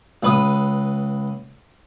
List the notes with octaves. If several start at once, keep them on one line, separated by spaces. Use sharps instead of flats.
C#2 B4 D#6